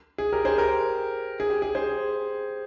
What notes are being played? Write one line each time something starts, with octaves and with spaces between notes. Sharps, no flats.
G#4
G4 A#4
G#4 C5
G4 A#4
G#4
G4
G#4
G#4 C5